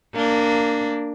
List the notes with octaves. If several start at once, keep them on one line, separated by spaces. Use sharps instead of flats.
A#3 D4